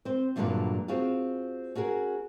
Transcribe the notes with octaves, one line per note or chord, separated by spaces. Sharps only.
C4 C5
E2 G2 A#2 D3 F#3 B4
C4 F4 F#4 G#4 F5
C#4 F#4 G#4 A#4